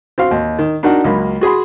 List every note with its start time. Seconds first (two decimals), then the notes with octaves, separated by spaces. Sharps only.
0.18 C4 F#4 F5
0.31 D#2
0.59 D#3
0.83 D4 D#4 F#4 A#4 F#5
1.04 C#2 F#3 A#3 B5
1.41 F#4 G#4 B5 C6